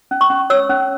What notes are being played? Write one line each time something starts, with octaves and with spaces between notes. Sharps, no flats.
C#4
C#6
C#4
C#5 E6
C#4